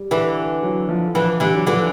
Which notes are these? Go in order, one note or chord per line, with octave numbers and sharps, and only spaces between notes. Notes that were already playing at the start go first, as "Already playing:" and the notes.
Already playing: G3
D3 E3
F#3
F3
D3 E3 F3
D3 E3 G3
F#3
D3 E3 F3